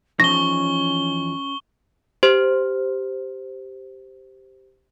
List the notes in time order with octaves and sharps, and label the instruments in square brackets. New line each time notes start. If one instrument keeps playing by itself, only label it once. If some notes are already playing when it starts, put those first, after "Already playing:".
[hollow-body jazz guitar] E2 F3 D#4 [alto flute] C#4 [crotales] C#6 G7 [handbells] A#6
[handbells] G4 C5